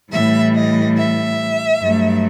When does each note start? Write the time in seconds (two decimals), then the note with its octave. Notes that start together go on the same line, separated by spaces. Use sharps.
0.12 A2 E3 G3 E5
0.54 D#5
0.97 E5
1.81 G2 F#3 A3